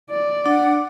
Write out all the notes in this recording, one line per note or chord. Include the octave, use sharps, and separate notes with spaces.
D5
D4 F#5